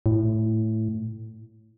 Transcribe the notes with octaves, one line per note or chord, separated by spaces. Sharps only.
A2